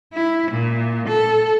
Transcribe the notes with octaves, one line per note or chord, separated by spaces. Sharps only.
E4
A#2
A4